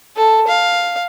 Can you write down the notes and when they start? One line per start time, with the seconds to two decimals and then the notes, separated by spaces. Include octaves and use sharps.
0.16 A4
0.47 F5